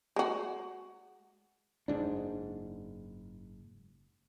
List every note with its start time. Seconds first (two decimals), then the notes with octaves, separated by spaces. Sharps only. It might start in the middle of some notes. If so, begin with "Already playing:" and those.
0.16 G#3 F#4
1.88 F#1 G#2 D4